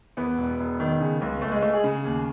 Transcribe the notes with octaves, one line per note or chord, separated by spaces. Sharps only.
E2 B3
E1
E1
D#3
C#3
C#2
C#2 A3
G#3
G#3 A3
G#4
C#3
D#2